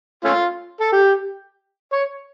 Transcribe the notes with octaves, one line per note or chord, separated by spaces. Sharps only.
A3 C#4 F4
A4
G4
C#5